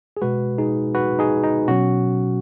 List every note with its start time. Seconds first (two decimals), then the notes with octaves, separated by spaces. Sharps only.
0.17 G#4
0.21 B2 G#3 F#4 B4
0.58 D#4 G#4
0.95 F#4 B4
1.19 D#4 G#4
1.43 D#4
1.68 B2 F#3 C#4 F#4